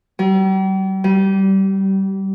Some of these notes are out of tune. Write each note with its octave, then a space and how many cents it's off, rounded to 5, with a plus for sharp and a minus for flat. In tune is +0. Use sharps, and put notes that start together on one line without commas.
G3 -40
G3 -20